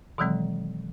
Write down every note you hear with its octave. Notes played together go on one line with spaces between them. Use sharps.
B2 D#3 E3 F#3 G#3 C4